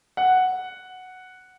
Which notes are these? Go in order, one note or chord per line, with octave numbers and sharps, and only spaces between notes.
F#5